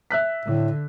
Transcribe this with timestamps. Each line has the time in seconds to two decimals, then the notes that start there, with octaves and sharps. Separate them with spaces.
0.11 E5 F#6 B6
0.46 A2 D3